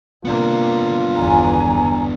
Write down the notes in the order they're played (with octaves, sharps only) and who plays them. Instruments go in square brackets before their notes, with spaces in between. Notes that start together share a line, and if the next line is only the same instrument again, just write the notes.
[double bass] C3 A#3 [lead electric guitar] B3 D4 [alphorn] F4
[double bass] G1 E2 [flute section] G#5 A#5